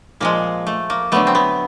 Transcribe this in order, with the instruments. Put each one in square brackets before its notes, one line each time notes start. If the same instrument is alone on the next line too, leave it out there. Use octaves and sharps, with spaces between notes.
[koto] A#2 F3 G#3 A#3
A3
A#3
D3 F#3 A3 B3
C4
B3